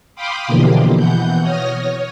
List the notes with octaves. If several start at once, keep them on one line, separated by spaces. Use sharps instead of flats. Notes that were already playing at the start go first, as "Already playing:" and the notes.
F5 G5 B5 C6 D6 D#6
B2 D3 E3 F3 A#3 G4
B2 E3 F#5 G6
C#5 D#6 F6 A#6
C#5